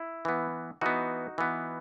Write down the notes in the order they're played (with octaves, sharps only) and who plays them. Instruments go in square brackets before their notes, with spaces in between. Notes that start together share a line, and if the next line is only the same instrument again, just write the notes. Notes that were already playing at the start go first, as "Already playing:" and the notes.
Already playing: [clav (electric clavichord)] E4
E3 B3
E3 B3 D#4 F#4
E3 B3